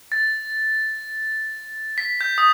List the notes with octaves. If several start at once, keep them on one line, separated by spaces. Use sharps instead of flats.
A6
B6
G6
D#6